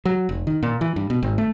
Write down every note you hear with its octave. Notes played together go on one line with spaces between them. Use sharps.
F#3
F1
D#3
A#2
E3
G2
B2
G#1
A3